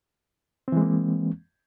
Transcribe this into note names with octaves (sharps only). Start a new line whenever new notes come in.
E3 G#3 A#3 C4